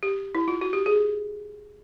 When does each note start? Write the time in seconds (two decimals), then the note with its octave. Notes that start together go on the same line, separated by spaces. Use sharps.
0.03 G4
0.35 E4
0.48 F4
0.61 F#4
0.73 G4
0.86 G#4